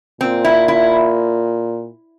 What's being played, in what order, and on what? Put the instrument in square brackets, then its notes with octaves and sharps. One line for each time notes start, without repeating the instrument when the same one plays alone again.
[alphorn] A#2 [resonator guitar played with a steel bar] C4
[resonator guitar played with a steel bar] E4
E4